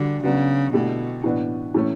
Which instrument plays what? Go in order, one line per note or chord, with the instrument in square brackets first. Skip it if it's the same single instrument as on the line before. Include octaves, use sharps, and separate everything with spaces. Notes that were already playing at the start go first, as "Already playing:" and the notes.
Already playing: [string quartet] D3 [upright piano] G3 D4 F#4
[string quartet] C#3 [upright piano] F#3 B3 D4 F#4
[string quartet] B2 [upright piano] D3 A3 E4 G4
[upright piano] A2 E3 B3 D4
A2 E3 A3 C#4